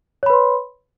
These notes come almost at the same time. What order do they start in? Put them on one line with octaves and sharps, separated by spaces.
C#5 B5 B4 C6